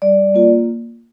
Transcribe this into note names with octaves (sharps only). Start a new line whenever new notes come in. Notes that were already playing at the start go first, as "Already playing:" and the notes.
G3 D5
A#3 F4